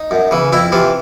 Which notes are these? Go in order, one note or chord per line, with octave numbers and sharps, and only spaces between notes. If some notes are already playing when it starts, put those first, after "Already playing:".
Already playing: D#4
F#2
C#3 E3
F2 E4
C3 E3 F4